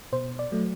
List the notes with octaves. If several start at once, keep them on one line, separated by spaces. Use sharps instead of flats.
B2 C5
D5
F#3 A3